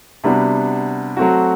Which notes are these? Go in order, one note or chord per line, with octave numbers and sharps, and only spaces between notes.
C3 G3 B3 D4 F#4
F#3 A3 C4 F#4